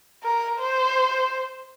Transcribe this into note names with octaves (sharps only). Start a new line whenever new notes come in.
A#4
C5